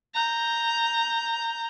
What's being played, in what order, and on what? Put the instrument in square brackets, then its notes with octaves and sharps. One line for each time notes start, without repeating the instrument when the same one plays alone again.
[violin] A#5 G6